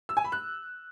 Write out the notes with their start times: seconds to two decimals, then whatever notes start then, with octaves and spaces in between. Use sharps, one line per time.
0.09 E6
0.17 G#5
0.24 B5
0.32 F#6